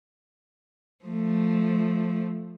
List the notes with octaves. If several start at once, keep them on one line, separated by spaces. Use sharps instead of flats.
F3 A3